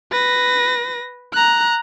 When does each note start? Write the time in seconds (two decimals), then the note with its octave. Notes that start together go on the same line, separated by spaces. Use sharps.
0.12 B4 A#6
1.33 A#5 F#6